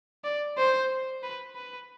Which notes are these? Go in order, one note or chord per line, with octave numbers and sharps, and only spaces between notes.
D5
C5
B4
B4